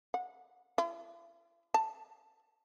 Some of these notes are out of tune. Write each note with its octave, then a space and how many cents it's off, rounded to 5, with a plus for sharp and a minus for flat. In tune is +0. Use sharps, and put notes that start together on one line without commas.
F#5 -20
E4 +45
A5 +0